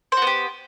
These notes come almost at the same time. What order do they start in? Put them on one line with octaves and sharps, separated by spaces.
C5 F#4 B3 G4